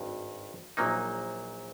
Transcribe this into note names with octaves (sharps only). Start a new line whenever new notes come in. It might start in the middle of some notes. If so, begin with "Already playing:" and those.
Already playing: G#1 G2
A#1 A#2 F#3 A#3 D#4